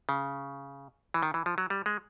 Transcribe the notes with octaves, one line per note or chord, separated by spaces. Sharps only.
C#3
E3
D#3
E3
F3
F#3
G3
G#3